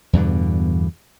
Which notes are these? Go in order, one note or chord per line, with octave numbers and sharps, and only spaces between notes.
E2 G2 B2 D3